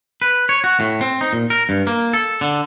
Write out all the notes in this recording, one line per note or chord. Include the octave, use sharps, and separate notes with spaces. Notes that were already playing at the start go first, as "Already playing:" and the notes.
B4
C#5
F#4
A2
C4
D#4
A#2
A#4
G2
A#3
A4
D3